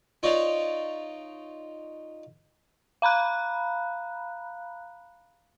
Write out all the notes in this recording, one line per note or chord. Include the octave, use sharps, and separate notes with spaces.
D#4 F4 C#5 D5
F5 A#5 B5 F#6